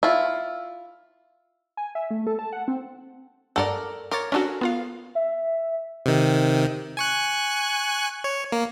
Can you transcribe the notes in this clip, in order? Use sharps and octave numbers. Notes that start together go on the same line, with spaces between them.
E4 F4
G#5
E5
A3
A4
A5
F#5
C4
G2 A4 A#4 D5 F#5
A#4 C#5 C6 D6 A6
C#4 D4 F#4 A4 A#4
B3 F4 F5
E5
C3 D#3
G#5 C#6 F#6
C#5
A#3